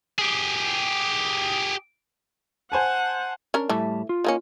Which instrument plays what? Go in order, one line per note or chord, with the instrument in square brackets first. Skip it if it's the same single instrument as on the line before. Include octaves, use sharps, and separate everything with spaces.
[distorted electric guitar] G4 G#4
[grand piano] C5 G#5 A5 [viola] F#5
[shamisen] C#4 D4 A#4
[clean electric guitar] A2 G3 A5 [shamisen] E3 A3
[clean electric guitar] F4
[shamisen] D#3 A#3 C#4